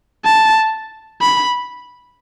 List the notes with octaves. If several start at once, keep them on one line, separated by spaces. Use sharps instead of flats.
A5
B5